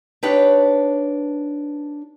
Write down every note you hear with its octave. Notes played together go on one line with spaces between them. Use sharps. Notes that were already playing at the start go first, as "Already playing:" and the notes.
D4 D#4 G4 B4 C#5